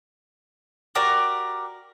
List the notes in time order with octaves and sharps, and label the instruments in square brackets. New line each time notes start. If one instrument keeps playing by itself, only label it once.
[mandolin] F#4 G4 A#4 D5